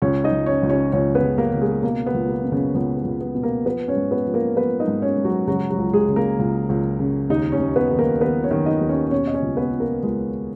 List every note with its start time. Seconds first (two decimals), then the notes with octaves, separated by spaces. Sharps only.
0.02 C#2 C#4 C#5
0.24 D#4 D#5
0.32 C#2
0.46 C#4 C#5
0.63 C#2
0.70 C#4 C#5
0.92 C#2 C#4 C#5
1.15 B3 B4
1.23 C#3
1.38 A#3 A#4
1.53 C#3
1.61 G#3 G#4
1.83 B2 A#3
2.07 B3
2.14 C#2
2.29 A#3
2.44 B2
2.52 C#3 C#4
2.74 C#2 B3
2.97 B3
3.04 C#2
3.21 B3
3.35 B2
3.43 A#3 A#4
3.65 F3 B3 B4
3.88 C#4 C#5
3.96 G#2
4.11 B3 B4
4.26 F3
4.34 A#3 A#4
4.56 F3 B3 B4
4.79 D#4 D#5
4.87 G#2
5.02 C#4 C#5
5.17 G#2
5.25 F#3 F#4
5.48 C#3 F#3 F#4
5.70 F#3 F#4
5.78 C#2
5.93 G#3 G#4
6.08 C#3
6.16 A#3 A#4
6.39 C#2
6.69 C#2
6.99 C#3
7.30 D#2 D#4 D#5
7.52 C#4 C#5
7.60 D#2
7.76 B3 B4
7.90 D#3
7.98 A#3 A#4
8.21 D#3 B3 B4
8.44 C#4 C#5
8.51 D#3
8.66 D#4 D#5
8.81 D#2
8.89 C#4 C#5
9.11 B2 C#4 C#5
9.27 D#5
9.34 C#4 C#5
9.42 C#2
9.57 B3 B4
9.72 B2
9.80 A#3 A#4
10.03 C#2 G#3 G#4